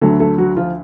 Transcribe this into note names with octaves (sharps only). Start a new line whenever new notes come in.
D2 D3 F#3 A3 A4
A3 A4
F#3 F#4
F3 F4